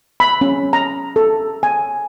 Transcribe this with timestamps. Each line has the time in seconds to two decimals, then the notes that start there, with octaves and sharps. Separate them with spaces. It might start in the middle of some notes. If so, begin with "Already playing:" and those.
0.20 B5
0.41 C#4
0.73 A#5
1.16 A4
1.63 G#5